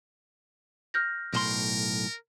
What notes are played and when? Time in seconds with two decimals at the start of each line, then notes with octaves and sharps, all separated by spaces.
0.94 F6 G6 A#6
1.34 B1 A2 A#4 C6